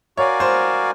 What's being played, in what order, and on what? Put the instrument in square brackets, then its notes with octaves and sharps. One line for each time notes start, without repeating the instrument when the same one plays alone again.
[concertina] F#4 A#4 D5 F5 G#5 [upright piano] C#5
[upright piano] C5